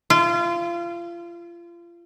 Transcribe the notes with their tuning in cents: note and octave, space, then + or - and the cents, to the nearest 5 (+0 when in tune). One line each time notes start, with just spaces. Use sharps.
F4 -30